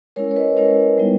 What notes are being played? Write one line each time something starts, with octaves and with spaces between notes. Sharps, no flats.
G#3 C#4 E4 A#4 C#5
C#5
B4 D#5
G#3 C#4 E4 A#4 C#5
G3 B3 D#4